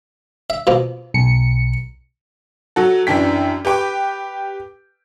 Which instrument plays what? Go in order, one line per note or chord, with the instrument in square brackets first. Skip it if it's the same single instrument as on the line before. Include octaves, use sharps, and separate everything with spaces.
[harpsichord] E5
B2 F3 A#3
[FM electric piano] B1 C#7
[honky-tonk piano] F#3 F#4 A4
F#2 E3 D4 G5 B6
G4 B4 G5 D6